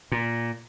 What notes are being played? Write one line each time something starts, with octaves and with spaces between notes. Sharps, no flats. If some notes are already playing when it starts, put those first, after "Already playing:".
A#2